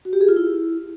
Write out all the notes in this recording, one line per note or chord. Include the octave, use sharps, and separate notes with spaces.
F#4
G4
G#4
F4
E4